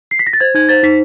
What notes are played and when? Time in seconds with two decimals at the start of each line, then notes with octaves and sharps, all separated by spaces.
0.11 C7
0.19 B6
0.27 A#6
0.33 A6
0.40 C5 G#6
0.55 D#4 G#6
0.69 C5 A6
0.83 D#4 B6